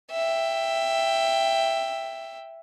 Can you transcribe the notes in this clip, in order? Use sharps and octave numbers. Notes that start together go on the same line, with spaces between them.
E5 G5